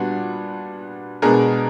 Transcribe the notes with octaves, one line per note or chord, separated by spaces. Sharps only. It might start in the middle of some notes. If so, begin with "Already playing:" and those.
Already playing: A#2 G3 B3 D4 F#4
B2 G#3 B3 D4 G#4 A#4